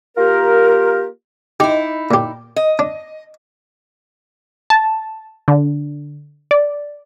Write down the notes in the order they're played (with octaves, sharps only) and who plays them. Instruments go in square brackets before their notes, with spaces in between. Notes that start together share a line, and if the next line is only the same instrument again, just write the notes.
[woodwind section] A#3 F4 G4 A#4
[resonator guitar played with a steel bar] D#4 E4 [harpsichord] G4
[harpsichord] A#2 G4
[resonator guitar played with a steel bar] D#5
[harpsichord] D4
[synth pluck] A5
D3
D5